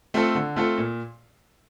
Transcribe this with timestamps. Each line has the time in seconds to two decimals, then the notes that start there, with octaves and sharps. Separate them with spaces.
0.14 A3 C4 F4 A4
0.35 D3
0.56 A3 C4 F4 A4
0.78 A#2